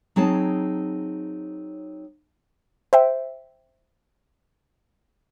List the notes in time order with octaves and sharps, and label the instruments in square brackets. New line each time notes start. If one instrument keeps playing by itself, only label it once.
[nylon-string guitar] F#3 C4 D#4 G#4 C#5 A5
[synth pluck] C5 E5 G5